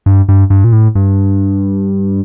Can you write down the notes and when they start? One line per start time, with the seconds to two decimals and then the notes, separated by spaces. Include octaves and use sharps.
0.06 G2
0.28 G2
0.50 G2
0.64 A#2
0.72 A2
0.95 G2